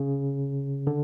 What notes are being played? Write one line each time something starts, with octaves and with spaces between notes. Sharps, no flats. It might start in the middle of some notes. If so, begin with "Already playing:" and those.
Already playing: C#3
D3